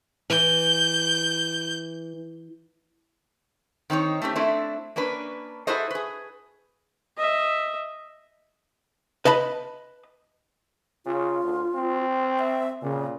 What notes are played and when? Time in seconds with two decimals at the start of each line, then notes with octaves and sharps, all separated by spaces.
0.30 E3 G6
3.90 D#3 C4 D#4 C#5
4.22 A3 C4 C#4 G4
4.35 A3 C4 D4 E4 A4
4.96 A#3 C#4 D4 B4
5.67 E4 F#4 G#4 A4 C5 D#5
5.91 G#4 B4
7.17 D#5 E5
9.25 B4 D#5 A5 B5
11.06 C#3 F4
11.43 D2
11.75 C4
12.39 E5
12.82 A#2 C#3